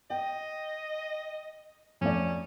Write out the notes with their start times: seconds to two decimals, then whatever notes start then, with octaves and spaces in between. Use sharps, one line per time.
0.10 D#5 G5
2.01 F2 A3 C#4 D5